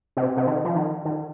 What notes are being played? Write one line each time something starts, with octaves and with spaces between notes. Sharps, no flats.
C3
C3
D#3
F3
D#3
D#3